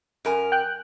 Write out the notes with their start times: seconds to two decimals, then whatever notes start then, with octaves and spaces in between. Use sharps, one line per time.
0.25 F#2 A#4 G#5
0.52 G5 F#6